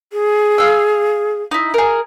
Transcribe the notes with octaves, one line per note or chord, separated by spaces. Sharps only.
G#4
F5 E6
D#4 E4
G#4 A#4